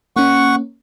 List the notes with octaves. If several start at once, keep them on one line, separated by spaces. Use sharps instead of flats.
A#3 C#4 F#5 C#6